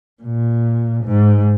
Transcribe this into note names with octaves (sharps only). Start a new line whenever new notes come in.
A#2
G#2